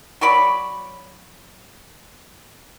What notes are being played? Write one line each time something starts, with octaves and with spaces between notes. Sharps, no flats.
F#3 C#5 D5 B5